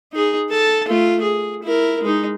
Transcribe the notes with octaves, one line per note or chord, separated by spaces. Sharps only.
D#4 G#4
A4 A5
A3 F4
G#4
E4 A#4
G#3 D#4